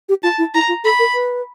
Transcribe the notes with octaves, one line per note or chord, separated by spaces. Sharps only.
G4
F4 A5
E4
E4 A#5
F4
A4 B5
A#4
B4